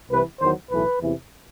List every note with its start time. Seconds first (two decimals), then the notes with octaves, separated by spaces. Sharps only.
0.11 C2 C3 E3 B4
0.41 E2 D#3 F#3 C5
0.71 B1 A2 E3 A3 B4
1.01 E2 C3 E3